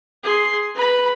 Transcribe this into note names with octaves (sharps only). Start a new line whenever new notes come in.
G#4 C6
B4 B5